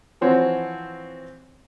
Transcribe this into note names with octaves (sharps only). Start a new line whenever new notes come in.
E3 F3 C4 F#4 C#5